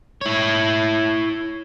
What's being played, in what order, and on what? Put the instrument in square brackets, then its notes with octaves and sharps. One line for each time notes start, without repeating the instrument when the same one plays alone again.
[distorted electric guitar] E4 C#5